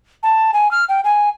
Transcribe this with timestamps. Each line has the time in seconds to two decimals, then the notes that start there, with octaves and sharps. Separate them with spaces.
0.23 A5
0.53 G#5
0.71 F6
0.89 G5
1.04 G#5